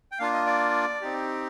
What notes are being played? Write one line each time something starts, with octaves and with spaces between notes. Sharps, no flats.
G5
A#3 D4 F4 F5
D#5
D5
C4 D#4 G4